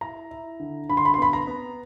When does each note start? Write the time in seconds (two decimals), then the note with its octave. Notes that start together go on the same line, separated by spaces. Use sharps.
0.01 E4 A#5
0.31 E4
0.60 D3
0.89 D3 B5
0.97 C6
1.05 B5
1.14 C6
1.18 B3 B5
1.33 A#5
1.47 B3